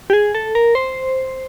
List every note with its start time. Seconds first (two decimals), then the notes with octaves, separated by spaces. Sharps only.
0.10 G4
0.13 G#4
0.35 A4
0.55 A#4
0.75 C5